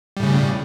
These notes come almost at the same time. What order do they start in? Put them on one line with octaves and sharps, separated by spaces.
G3 A2 C#3